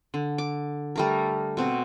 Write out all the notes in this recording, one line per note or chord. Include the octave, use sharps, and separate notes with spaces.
D3
D6
G3 A3 A#4
B2 C4 F#4